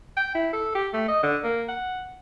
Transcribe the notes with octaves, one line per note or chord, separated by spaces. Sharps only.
G5
E4
A4
G4
A3
D#5
D3
A#3
F#5